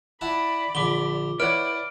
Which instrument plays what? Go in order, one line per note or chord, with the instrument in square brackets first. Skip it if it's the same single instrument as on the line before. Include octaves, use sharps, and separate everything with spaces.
[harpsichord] E4 F#5 A5 [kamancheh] D5 B5
[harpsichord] A#1 D3 [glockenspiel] D6 G7
[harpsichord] E4 F#5 [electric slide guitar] B4 C#5 [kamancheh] D5 [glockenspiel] F6 D7